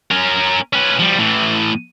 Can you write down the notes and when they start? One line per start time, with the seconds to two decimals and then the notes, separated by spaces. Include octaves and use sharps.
0.11 C#4 A#4
0.73 C#4 B4
0.99 F3 G3
1.19 A2 E3